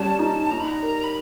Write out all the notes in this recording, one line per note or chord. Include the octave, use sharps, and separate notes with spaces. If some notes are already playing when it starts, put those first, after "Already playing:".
Already playing: G3 C#4 A5
D#4
D#4 A#5
B5
A#5
A#4
B5